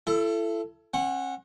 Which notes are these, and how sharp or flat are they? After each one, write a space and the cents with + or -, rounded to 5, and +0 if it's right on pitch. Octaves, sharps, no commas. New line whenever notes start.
E4 +35 A4 +0
C#4 -45 F#5 -5